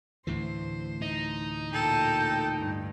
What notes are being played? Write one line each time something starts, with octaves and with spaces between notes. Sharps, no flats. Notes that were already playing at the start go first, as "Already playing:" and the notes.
D2 A2 E3 C5
D#4
A#2 A4 G5 G6
G2